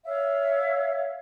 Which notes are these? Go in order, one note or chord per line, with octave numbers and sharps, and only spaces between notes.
C#5 E5 F5